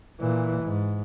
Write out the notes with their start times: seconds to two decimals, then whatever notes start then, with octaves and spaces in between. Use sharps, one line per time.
0.20 A#2 E3
0.63 G#2